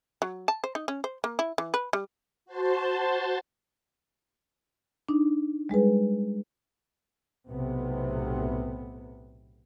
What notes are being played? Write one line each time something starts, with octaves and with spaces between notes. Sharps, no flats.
F#3
A5
C5
D#4
C#4
C5
A#3
E4
E3
B4
G3
F#4 C5 A5 C6
D4 D#4
G3 G#3 G#4 B4
B1 A2 C3 B3